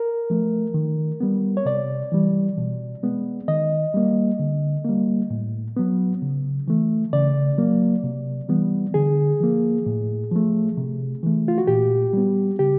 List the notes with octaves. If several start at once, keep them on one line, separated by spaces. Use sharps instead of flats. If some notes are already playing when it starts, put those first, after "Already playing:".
Already playing: A#4
F3 A3
D#3
G3 B3
C#5
C3 D5
E3 G3
B2
G#3 B3
D#3 D#5
G3 A#3
D3
G3 A#3
A2
F#3 B3
C#3
E3 A3
C#3 D5
F#3 A#3
C3
E3 G3 B3
D3 G#4
F3 A#3
A2
F3 A3
C3
E3 A3
F4
F#4
A#2 G4
G3 B3
C#3 G4